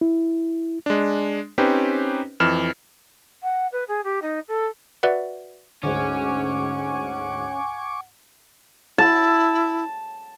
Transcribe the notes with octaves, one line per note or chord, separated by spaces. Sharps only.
E4
G#3 D4
C4 C#4 D#4 G4 B4 C5
F2 E3 F6 E7
F#5
B4
G#4
G4
D#4
A4
F#4 B4 D5 E5 F#5
D2 G#2 C#4 F#5 G#5 C#6 D6
E4 A5